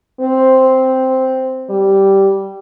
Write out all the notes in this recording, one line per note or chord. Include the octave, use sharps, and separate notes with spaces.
C4
G3